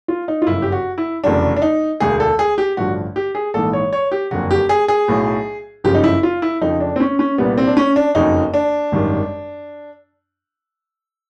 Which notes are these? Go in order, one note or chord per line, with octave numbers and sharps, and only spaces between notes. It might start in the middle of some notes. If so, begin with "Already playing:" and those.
F4
D#4
F4
G1 F#2 C#3 E4
G4
F#4
E4
F1 E2 C#3 F#3 D4
D4
D#4
E1 D2 D3 G#4
A4
G#4
G4
A1 G2 D3 F3 F#4
G4
G#4
A#1 G#2 E3 A4
C#5
C#5
G4
F#1 F2 D3 F#3 F#4
G4
G#4
G#4
B1 A2 F#3
G1 F#2 C#3 F3 G4
D#4
E4
F4
E4
F2 C#3 F3 D#4
D4
C4
C#4
C#4
C2 A#2 G3 B3
C4
D4
C#4
D4
F#1 F2 C#3 F#3 D#4
D4
G#1 F#2 D#3 G3